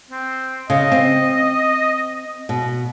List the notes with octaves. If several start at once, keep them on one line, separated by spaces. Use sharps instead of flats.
C4
C#3 D#5
C4
B2